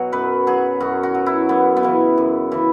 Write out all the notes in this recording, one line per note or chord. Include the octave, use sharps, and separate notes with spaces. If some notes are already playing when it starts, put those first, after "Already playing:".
Already playing: B2 F#3 F#4 G#4
F#2 B4
F#3 G#4
F#2 F#4
F#4
F#3
E4
F#2 B3
B3
C#3 E3
F#2
C#3 E3